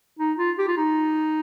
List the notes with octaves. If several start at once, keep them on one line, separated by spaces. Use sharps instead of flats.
D#4
F4
G4
F4
D#4